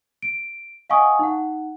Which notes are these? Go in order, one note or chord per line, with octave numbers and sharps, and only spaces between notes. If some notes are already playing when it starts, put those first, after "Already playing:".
D7
D#5 F5 F#5 G#5 C#6 D#6
D#4 F#5